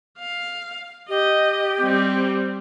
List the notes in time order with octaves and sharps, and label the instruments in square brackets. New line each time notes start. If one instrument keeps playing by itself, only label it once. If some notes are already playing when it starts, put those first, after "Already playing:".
[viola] F5
[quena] G4 [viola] D#5
[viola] G3 C4